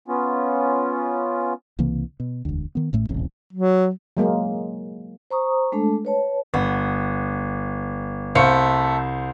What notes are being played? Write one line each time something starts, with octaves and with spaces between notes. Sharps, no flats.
B3 C#4 F4
C2 C#3 E3 A#3
B2
E1 D2
D#3 B3
A1 A2 A3
D#1 A1 E2 C3
F#3
F#3 G#3 A#3
C5 A#5 C#6 D#6
G#3 A3 D4 A4 A5
B4 C#5 A5
G1 B3
C2 A3 C5 F5 C#7